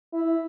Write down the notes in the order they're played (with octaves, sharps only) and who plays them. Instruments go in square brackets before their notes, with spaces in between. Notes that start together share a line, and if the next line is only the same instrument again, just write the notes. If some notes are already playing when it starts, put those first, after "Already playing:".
[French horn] E4